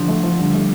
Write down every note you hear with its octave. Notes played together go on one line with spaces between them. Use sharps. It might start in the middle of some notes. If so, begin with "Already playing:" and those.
Already playing: D3 F3
A3
F3
D3 G3
A3